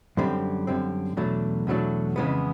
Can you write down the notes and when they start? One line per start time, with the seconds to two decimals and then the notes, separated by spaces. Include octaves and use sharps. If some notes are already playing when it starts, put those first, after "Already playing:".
0.17 F#2 D3 G3 C4
0.67 F#2 D3 G3 C4
1.17 E2 B2 F#3 A3 D4
1.67 E2 B2 F#3 A3 D4
2.16 F2 C#3 E3 G#3 B3